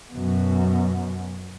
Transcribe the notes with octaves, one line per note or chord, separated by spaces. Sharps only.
F#2 B2